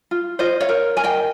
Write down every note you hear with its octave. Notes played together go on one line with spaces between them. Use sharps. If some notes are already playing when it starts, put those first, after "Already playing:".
F4
F4 C5 D#5
C#5 F5
A#4
A#4 G#5
D#5 G5